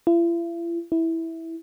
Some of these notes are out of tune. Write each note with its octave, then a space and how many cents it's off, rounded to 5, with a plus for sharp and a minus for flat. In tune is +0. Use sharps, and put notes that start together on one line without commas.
E4 +45
E4 -10